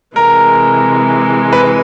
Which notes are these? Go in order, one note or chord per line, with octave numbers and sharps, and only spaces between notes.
C3 E3 G#3 A#4
B4